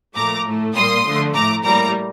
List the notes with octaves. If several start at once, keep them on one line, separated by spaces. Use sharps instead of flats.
A#2 F3 A3 A#5 D6
A2 A3
A#2 G3 A#3 C6 D#6
D3 F3 A3
A2 A3 A#5 D6
A2 G3 A#3 A#5 D6